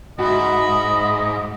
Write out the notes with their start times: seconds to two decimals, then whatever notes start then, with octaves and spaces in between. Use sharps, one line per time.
0.19 G#2 F#4 D#5 E5 B5